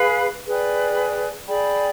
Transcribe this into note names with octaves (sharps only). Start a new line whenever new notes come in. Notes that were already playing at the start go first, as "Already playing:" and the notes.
Already playing: G#4 B4 F5 B5
G#4 B4 D5 G5
G#4 D5 G5 B5